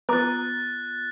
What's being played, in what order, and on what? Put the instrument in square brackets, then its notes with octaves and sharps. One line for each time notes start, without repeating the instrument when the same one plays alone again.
[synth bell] B3 F4 [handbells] B4 A#5 D6 [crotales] F#6 A6